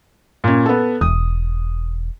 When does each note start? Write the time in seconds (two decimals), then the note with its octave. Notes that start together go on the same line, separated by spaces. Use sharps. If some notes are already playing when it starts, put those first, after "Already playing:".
0.44 A#2 C#4
0.66 B3 A4
1.01 E1 D#6